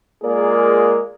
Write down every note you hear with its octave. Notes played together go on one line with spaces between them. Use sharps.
G#3 A#3 F4 G#4 A#4 D5